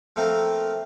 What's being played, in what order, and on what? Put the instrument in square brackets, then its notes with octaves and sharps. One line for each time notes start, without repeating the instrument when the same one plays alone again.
[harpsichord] F3 A3 A#3 C4 F4